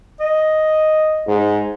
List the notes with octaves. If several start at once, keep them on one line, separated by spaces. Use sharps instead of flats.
D#5
G#2